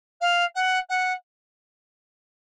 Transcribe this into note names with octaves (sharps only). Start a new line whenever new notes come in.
F5
F#5
F#5